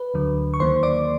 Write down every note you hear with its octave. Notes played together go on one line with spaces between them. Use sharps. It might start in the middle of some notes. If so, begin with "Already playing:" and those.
Already playing: B4
D2 D3 F#3
C#6
D#2 D#3 F#3 A#3 C5 C6
D5 D6